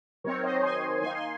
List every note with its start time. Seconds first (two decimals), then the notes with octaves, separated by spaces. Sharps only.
0.24 D#3 F#3 C4 A#4 C#5
0.43 C5 D#5
0.62 G#5 C6
1.01 D#3 A#3 D#4 G#5 C6
1.15 G#5 C6